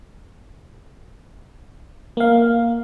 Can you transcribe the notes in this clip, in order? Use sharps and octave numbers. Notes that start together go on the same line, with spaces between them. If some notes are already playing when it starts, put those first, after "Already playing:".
A#3 F5